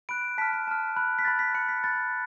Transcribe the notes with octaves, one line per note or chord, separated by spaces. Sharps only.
B5 F#6 D7
A5 F6 B6
B6
A5 F6
B5 F#6
B6
B5 F#6 A6
B6
B5 F#6 C#7
B6
B5 F#6 A6